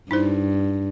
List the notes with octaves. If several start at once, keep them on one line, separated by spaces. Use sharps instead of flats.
G2 D#4 E4 C5